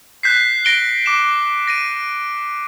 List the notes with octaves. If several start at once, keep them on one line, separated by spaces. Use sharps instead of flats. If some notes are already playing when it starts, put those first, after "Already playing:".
F#6 G6 B6 C7
A#6 D7 G7
D6 E7
A#6 D7 D#7